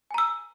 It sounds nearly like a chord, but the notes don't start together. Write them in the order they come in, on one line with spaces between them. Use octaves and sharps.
G#5 A#5 E6